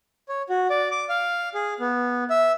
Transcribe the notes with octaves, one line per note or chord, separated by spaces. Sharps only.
C#5
F#4
D5
D6
F5
G#4
B3
E5